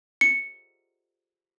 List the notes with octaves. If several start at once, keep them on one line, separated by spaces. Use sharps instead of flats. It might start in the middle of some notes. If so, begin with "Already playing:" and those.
C#7